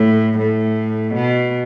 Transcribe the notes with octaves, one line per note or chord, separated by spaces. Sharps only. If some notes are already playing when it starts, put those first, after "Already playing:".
Already playing: A2
A2
B2